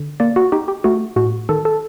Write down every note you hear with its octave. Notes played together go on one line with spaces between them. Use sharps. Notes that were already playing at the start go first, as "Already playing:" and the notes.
Already playing: D3
A#3 D5
F#4
D#4 G4
G4
A3 F#4
A2 F#4
D#3 A4
A4